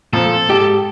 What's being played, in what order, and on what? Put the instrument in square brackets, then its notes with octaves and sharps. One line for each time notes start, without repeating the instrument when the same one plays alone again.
[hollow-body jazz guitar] F2 A#2 F3 [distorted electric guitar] A4
[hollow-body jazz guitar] G#2 G4